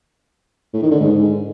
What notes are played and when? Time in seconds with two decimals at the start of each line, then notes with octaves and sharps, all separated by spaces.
0.73 A2
0.82 D#3
0.91 D3
1.00 G#2